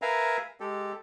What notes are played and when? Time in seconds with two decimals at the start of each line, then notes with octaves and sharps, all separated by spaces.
0.02 A#4 B4 E5 F5 G#5 A#5
0.60 G#3 G4 A4